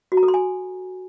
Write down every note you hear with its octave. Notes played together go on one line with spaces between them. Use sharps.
F#4
A#5
A4
C6
G#5